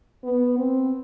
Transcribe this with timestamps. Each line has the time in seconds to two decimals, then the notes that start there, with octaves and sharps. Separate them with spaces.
0.24 B3
0.59 C4